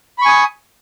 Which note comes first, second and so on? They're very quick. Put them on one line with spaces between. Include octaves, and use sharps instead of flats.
B5 C#6 G#5 D#6